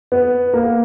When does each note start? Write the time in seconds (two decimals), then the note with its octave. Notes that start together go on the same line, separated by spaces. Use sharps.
0.12 B3
0.53 A#3